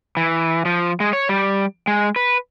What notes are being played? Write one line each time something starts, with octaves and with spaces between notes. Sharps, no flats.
E3
F3
G#3
C#5
G3
G#3
B4